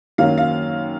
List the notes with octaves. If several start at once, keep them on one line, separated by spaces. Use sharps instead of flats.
F#2 D#3 F#3 A#3 F5
F5